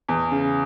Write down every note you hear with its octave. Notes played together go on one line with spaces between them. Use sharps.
E2
C#3